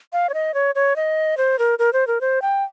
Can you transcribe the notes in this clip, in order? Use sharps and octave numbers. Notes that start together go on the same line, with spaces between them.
F5
C#5
D#5
C#5
C#5
D#5
C5
A#4
A#4
C5
A#4
C5
G5